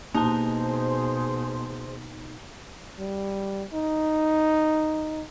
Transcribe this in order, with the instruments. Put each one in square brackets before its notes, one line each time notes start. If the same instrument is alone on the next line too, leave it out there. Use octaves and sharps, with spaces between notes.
[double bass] B2 [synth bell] A#3 A5 [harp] D#4 [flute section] G#4 C5 C6
[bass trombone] G3
D#4